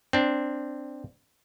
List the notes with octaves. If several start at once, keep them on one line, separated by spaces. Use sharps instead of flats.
C4 D4